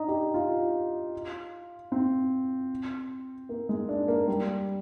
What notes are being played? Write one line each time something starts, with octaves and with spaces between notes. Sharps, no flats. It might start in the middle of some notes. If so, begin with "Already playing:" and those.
Already playing: D4 D#4
G4
F4
C4
A#3
G#3
D4
A#3
G3